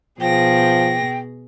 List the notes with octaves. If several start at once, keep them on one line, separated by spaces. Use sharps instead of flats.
B2 F3 G#4 G5 A#6